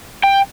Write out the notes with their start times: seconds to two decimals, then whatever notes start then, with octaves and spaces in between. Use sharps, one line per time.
0.23 G5